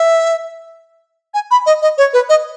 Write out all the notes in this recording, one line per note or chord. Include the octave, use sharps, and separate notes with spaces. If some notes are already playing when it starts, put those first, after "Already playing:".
Already playing: E5
G#5
B5
D#5
D#5
C#5
B4
D#5